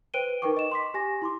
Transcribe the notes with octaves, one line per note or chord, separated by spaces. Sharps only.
B4 C5 G5 D7 D#7 G7
D#4 A#4 B4 G5 C#6 D6
D#5 E7
C6 D6 B6
G4 G#5 A#6
E4 C6 D6